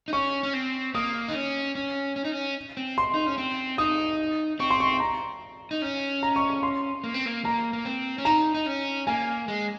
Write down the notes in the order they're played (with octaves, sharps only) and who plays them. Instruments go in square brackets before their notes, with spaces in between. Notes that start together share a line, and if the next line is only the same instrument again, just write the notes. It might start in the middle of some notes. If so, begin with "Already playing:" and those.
[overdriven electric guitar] D#4
[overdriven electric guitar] C#4 [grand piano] C#6
[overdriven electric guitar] C#4
C4
[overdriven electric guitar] A#3 [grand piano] D#6
[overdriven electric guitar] D#4
C#4
C#4
C#4
D#4
C#4
C4
[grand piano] C6
[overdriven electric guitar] D#4
C#4
C4
[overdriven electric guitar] D#4 [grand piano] D#6
[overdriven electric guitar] C4 [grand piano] C#6
[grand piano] C6
C#6
A#5
[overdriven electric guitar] D#4
C#4
[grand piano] A#5
C#6
C#6
C6
[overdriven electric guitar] A#3
C4
A#3
[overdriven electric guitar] A#3 [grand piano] A#5
[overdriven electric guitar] A#3
C4
C#4
[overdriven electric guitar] D#4 [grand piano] A#5
[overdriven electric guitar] D#4
C#4
[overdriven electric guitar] A#3 [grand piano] G#5
[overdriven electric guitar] G#3